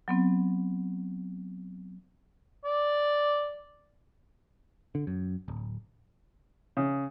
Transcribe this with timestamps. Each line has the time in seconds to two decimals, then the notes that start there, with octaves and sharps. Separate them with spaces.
0.08 F#3 B3 C4
2.65 D5
4.95 D3
5.07 F#2
5.48 D1
6.77 C#3